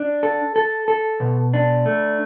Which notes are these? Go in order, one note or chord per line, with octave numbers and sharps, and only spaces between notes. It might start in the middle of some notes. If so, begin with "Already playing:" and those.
Already playing: D4
A4
A4
A4
B2
D4
A3